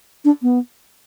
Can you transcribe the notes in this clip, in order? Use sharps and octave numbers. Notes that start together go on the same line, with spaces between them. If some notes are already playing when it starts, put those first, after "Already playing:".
D4
B3